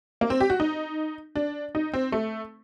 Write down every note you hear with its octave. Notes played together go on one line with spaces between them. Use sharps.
A#3
C4
G4
F#4
D#4
D4
D#4
C4
A3